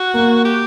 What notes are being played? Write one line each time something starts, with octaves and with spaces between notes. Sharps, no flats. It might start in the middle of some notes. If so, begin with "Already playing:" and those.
Already playing: F#4
A#3
G4